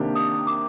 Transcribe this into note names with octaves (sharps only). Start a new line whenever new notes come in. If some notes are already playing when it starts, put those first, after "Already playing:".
Already playing: C3 D#3 A#3 D4 G4
D#6
D6